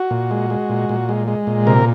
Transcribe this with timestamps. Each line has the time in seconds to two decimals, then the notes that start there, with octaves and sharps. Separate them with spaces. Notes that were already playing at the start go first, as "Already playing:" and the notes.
Already playing: F#4
0.11 A#2
0.31 G#3
0.50 G#3
0.69 A#2
0.89 A#2
1.09 G#3
1.28 G#3
1.47 A#2
1.67 C3 A#4